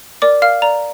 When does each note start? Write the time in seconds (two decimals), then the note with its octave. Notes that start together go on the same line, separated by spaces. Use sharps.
0.22 A#4 D5 D6
0.42 A#4 F5 F6
0.62 D5 A#5